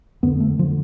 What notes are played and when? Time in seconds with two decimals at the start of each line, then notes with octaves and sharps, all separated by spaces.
0.23 F2 D3 B3
0.40 A3
0.59 D3 F3